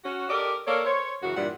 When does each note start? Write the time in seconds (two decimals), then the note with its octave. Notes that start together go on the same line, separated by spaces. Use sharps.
0.05 C#4 F#4
0.29 G4 A4 A#4 D5 D#5
0.67 A#3 A4 A#4 C#5 D5
0.85 C5 C#5
1.23 F#2 C#3 E3 F#4
1.37 G2 A#2 E3 G3 F#5